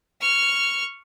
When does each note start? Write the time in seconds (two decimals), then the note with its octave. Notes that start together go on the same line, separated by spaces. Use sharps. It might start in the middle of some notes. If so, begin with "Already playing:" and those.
0.21 C#6 F6